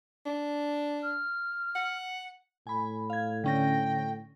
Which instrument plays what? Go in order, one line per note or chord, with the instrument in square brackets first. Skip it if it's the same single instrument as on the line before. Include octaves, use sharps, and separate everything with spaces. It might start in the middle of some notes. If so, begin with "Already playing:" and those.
[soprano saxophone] D4
[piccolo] F6
[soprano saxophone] F#5
[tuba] A2 [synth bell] G#5 B5
[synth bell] F5 G#6
[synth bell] D3 C#4 A#6 [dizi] G5